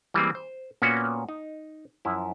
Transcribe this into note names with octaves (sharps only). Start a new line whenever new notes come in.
E3 G3 G#3 A#3 C4
C5
A#2 A#3 B3 C#4 F#4
D#4
F#2 F3 E4